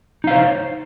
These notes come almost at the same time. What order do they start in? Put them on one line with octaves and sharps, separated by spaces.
D#4 F5 C5 C#5